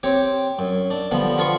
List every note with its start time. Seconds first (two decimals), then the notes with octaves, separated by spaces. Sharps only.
0.03 C4 G4 C#5
0.59 F#2
0.90 D4
1.11 D3 F3 G3 B3
1.37 D3 F3 F4 B4 C#6